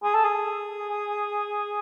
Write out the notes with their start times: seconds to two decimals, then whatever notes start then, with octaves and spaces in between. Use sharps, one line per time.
0.03 G#4
0.14 A4
0.24 G#4